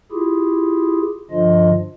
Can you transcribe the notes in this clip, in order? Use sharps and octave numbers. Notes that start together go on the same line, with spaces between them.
E4 F4 G4 G#4
G2 D3 F3 D4 F4 D#5